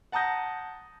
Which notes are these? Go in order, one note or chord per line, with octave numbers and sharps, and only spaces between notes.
F#5 A5 A#5 D#6 G6 A#6